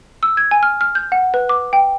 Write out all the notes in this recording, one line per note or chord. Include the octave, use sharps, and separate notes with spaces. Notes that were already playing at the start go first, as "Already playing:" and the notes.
E6
G#6
G#5
F6
F6
G6
F#5
B4
D6
G5